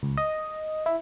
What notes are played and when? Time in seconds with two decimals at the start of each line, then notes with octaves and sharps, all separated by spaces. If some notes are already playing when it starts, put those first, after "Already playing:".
0.03 C#2
0.17 D#5
0.86 E4